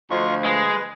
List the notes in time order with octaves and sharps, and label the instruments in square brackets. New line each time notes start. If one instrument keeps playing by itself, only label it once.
[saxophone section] D2 F3 [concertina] F4 D#5 C#6
[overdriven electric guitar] G#3 [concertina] B4